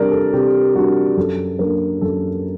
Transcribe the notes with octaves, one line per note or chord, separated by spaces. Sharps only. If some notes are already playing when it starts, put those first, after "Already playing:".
Already playing: C3 G3 D4 A#4 D5
A4
C3 G4
G3 D4 F#4
F#2 A4
F#3 A#3 D4 A#4
F#2 A4